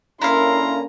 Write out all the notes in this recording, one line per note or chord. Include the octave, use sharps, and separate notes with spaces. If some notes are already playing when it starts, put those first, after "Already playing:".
D3 A#3 C#4 E4 A#4 F5 A#5 C6